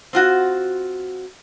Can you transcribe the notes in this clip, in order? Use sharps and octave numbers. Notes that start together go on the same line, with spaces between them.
C4 F4 F#4